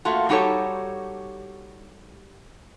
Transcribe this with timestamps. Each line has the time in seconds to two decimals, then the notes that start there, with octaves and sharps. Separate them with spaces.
0.05 A3 A#3 F4 F#4
0.29 G3 D#4 F#4 G4 A4 C#5